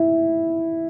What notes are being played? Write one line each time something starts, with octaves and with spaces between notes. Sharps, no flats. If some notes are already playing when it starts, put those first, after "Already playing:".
Already playing: E4